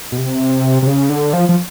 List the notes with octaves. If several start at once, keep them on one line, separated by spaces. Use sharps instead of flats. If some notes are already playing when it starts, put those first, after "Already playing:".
B2
C3
C3
C#3
D3
F3
F3